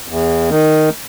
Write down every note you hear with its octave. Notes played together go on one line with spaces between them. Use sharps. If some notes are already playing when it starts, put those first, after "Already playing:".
E2
D#3